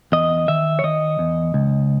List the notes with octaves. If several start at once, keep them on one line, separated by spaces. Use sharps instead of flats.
E2 D#5
D#3 E5
C#5
D#3 D#5
E2
C#2